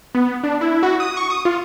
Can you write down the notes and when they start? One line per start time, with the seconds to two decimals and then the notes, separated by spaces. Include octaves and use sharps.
0.15 B3
0.44 D4
0.61 E4
0.83 F#4
1.00 D#6
1.17 C#6
1.30 D#6
1.45 F4